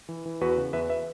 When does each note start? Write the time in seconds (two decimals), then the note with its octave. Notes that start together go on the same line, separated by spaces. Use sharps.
0.09 E3
0.26 E3
0.41 E2 F#4 B4
0.57 C#3
0.73 E2 B4 E5
0.89 B4 E5